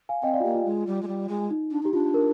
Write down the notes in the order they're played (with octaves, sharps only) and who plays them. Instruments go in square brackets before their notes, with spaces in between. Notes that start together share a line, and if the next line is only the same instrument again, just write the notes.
[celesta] F5 G#5
[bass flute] C4 [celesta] D#5 G5
[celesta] D5 F5
F4
[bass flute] A#3 [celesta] G4
[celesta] F4
[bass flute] G#3 [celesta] F4
[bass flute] G3
G#3
G3
G#3
[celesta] D#4
[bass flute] D4
[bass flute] D#4 [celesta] G4
[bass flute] D4 [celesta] F4
[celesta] A#4